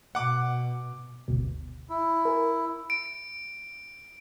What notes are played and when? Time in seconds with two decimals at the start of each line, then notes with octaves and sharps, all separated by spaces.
0.15 B2 F#5 D6
1.28 G1 D2 B2
1.90 E4
2.25 A#4 G#5 A#5
2.90 D7